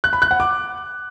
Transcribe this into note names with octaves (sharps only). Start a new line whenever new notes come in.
F#6
B5
F#6
F#5
D6